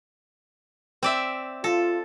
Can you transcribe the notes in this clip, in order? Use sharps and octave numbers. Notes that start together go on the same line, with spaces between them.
C4 D5 E5
F4 A4